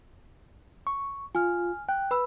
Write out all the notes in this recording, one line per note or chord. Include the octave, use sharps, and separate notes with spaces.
C#6
F4 G#5 F6
G5 F#6
B4 B5 E6